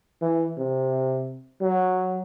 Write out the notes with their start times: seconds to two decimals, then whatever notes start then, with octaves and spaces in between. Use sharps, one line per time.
0.22 E3
0.58 C3
1.62 F#3